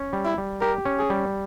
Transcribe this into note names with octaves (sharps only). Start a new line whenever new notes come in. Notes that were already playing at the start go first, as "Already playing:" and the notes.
Already playing: C#4
G3
E4
G3
G4 A#4
C#4
G#4
G3